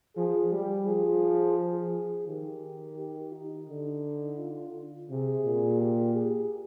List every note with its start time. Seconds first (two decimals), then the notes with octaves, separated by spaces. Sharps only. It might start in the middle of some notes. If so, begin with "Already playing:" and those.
0.16 F3 G#4
0.52 G3 G4
0.87 F3 G#4
1.58 G#4
2.28 D#3 G4
2.99 G4
3.33 D#4
3.68 D3
4.39 F4
5.10 C3 G#4
5.45 A#2
5.80 G4
6.15 G#4